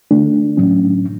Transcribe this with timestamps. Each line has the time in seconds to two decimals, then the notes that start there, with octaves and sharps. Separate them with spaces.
0.11 D3 A3 D4
0.57 A2 F#3 C#4